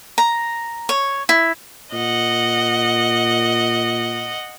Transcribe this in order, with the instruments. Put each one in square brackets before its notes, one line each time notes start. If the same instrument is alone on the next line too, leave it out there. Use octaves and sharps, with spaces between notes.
[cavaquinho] A#5
C#5
E4
[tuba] A#2 [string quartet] D#5 F#5